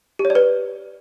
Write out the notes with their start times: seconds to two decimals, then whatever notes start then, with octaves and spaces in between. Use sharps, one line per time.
0.19 G4
0.25 C#5
0.30 D5
0.35 B4